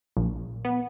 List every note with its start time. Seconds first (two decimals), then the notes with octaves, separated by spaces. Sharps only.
0.17 A#1
0.65 B3